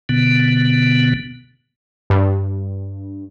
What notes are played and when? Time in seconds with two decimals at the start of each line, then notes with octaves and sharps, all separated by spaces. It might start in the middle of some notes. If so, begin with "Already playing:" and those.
0.09 B2 D3 B3
2.10 G2